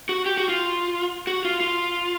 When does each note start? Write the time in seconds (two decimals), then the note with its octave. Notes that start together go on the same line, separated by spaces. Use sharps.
0.09 F#4
0.26 G4
0.38 F#4
0.49 F4
1.27 F#4
1.45 F4
1.60 F4